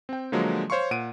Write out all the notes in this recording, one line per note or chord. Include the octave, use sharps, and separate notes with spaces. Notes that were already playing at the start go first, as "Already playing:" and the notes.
C4 G5
D3 F3 F#3 G#3 A#3
C5 C#5 F5 C6 C#6
A#2 F#5 D7 D#7